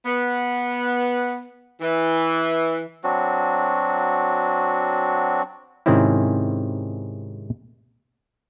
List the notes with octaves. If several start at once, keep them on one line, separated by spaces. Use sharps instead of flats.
B3
E3
F#3 C4 D4 F#4
G#2 C3 D#3 C4 C#4 E4